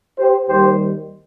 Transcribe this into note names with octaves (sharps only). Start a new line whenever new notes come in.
G4 C5
D#2 D#3 G3 G4 C5